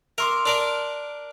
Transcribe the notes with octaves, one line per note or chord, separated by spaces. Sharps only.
A#4 E5 C6 D6
D4 A#4 D5